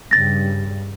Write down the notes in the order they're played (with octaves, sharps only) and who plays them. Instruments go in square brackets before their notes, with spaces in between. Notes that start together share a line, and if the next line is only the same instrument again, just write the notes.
[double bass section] G2 C#3 G3 [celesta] A6 A#6